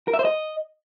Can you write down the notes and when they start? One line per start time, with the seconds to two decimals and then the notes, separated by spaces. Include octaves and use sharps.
0.08 A#4
0.13 E5
0.19 C5
0.25 D#5